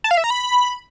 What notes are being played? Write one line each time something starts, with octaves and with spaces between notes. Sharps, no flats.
A5
F5
E5
A#5
B5